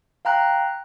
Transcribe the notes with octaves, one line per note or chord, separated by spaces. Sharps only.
F5 G5 A#5 F#6